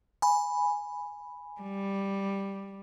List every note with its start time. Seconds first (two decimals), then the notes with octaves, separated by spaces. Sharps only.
0.22 G#5 B5
1.60 G3